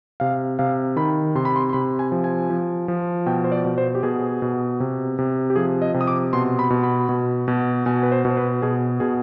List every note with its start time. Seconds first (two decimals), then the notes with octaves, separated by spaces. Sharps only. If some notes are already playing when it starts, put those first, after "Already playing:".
0.20 C3 F5
0.59 C3 F5
0.96 D#3 B5
1.35 C3 C6
1.45 B5
1.56 C6
1.69 C6
1.73 C3 B5
1.99 G#5
2.12 F3
2.24 G#5
2.50 F3
2.88 F3
3.26 B2 G5
3.44 C5
3.52 D5
3.65 B2
3.78 C5
3.95 G4
4.03 B2 G#4
4.42 B2
4.80 C3
5.19 C3
5.50 G4
5.56 F3 G#4
5.82 D#5
5.94 C3
6.01 D#6
6.07 D6
6.33 B2 C6
6.59 B5
6.70 B2
6.83 B5
7.09 B2
7.48 B2
7.86 B2 G#5
8.03 B4
8.12 C5
8.25 B2
8.30 C5
8.37 B4
8.62 B2 G#4
9.00 B2 G#4